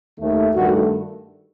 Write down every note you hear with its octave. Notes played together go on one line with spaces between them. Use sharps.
D#2 D#3 A3
G2 D#3 A3 F#4